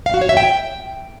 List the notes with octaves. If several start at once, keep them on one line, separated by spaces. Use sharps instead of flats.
F5
F#4
C#5
E5
G5